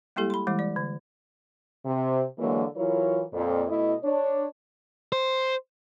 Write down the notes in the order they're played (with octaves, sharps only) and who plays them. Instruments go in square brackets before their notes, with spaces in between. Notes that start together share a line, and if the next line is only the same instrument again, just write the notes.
[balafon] G3 G#3 A#3 E4 G4 A4
B5 C6
E3 G3 G#3 E4
D5
D3
[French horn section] C3
D3 E3 F#3 G#3 A#3
E3 F#3 E4 F4 A#4 C#5
F2 A#2
B2 A3 E4 D#5
D4 C#5
[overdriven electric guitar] C5